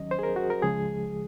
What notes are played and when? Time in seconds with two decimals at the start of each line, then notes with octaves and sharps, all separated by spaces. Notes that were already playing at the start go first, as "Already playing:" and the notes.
Already playing: D#2 D#3 F#3 C#4 D#5
0.11 C5
0.19 G#4
0.23 A#4
0.36 F#4
0.50 A#4
0.62 C#2 C#3 F3 G#3 G#4